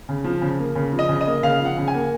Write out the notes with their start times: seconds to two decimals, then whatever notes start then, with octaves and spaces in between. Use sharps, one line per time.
0.09 C#3
0.24 F3
0.41 C#3
0.59 A#3
0.75 C#3
0.93 F3
0.99 D#5
1.09 C#3
1.21 D#5
1.27 A#3
1.43 C#3 F5
1.59 F3
1.65 F#5
1.78 C#3
1.88 G#5
1.94 A#3